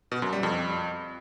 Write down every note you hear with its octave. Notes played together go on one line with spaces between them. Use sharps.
B2
F#2
G3
F2